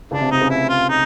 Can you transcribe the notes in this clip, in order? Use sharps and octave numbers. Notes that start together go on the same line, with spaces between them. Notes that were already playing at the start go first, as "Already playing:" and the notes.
C#2 C#3 D4
C3
C3 D#4
C#2 C#3
E4
F4
D#4